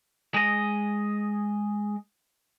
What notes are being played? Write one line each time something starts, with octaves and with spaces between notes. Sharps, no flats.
G#3 D#5